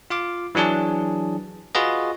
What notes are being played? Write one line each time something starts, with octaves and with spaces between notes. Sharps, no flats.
F4 F5 D6
E3 F#3 D4 G#4 A5
F4 F#4 G#4 B4 D#5